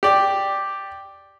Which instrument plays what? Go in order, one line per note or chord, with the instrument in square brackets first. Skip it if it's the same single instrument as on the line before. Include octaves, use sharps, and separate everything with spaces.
[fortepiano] G4 D5